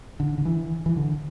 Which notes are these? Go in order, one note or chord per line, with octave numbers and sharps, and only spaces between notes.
D3
D3
E3
E3
D3